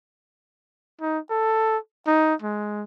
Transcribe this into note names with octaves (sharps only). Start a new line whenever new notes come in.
D#4
A4
D#4
G#3